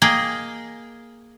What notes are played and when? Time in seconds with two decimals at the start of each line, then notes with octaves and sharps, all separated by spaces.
0.02 A#3 G#4 D#5 G5